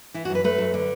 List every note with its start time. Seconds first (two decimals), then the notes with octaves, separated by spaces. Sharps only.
0.14 E3 E4
0.25 F#4
0.30 F#2 B4
0.44 A3 B4
0.58 F#2
0.74 D3